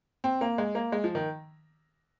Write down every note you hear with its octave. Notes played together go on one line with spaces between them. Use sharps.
C4
A#3
G#3
A#3
G#3
F3
D#3